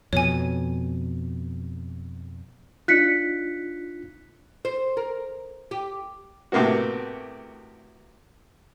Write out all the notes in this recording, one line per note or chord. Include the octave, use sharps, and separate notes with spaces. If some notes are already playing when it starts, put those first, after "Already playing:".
F2 B2 C#5 G#5
D4 D#4 F4 F#6 B6 C#7
C5
A#4
G4
A2 C3 A#3 B3 F#4